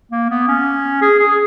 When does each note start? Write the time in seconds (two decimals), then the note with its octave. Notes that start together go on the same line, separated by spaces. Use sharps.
0.11 A#3
0.30 B3
0.48 C#4
1.02 G#4
1.19 G#4